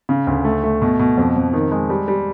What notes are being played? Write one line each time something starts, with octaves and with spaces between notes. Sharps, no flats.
C#3
D2
A3
A3
B2
B2
F2
F2
D#3
G#3
G3
G3